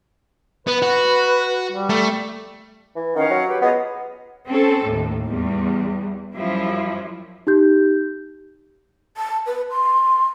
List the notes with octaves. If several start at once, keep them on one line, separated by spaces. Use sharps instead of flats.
B3 B4
F#4
G3
A3
E3
D#3 C#4 F5 F#5
F#3
G4 B4
B3 F4 G#4 D#5
C4 C#4 A4
D#2 A2
E2 G3
F#2 F3 G3 E4
D#4 G4 G6
A5
B4
C6